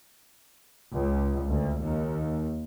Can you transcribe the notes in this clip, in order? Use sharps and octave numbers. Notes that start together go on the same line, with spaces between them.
C#2
D2
D#2